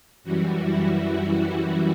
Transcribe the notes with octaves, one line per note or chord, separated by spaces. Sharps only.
F#2 E3 G3 F#4
E4
F#4